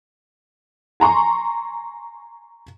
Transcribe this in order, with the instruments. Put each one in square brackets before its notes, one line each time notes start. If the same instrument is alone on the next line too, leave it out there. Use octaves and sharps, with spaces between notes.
[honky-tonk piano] G#5 A#5 C6 C#6